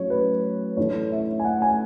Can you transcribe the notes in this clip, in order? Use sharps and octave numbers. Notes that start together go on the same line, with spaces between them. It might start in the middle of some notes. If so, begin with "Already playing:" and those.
Already playing: A2 F#3 C#4 C#5
B4
A2 E3 A3 D4 C#5
E5
G#5
F#5
G#5